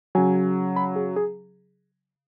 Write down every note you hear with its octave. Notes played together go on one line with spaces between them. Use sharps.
C#3 F#3 G#5
B5
G#4
G#4